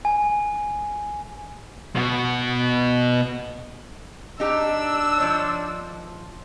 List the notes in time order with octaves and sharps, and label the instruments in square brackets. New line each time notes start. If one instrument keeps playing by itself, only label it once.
[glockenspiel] G#5
[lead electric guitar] B2 F#4
[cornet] D4 [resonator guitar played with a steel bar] D#4 G4 [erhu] E6
[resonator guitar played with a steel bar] F3 D#4 C#5